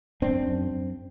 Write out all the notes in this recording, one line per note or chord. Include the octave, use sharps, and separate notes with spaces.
F#2 C4 D4
F#2
F#2